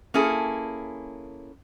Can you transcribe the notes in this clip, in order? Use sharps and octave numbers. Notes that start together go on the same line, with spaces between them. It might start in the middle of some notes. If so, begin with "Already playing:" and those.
A#3 C#4 E4 G#4 A4